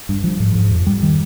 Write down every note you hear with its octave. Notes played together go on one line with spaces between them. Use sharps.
G2
F3
G#2
G#2
F2
G3
D#3